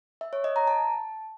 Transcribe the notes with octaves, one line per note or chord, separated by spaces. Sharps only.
E5
C#5
D#5
A#5
A5